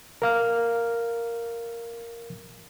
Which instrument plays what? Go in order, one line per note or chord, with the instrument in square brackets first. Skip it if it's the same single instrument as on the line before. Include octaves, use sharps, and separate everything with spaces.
[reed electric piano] A#4 F5 F6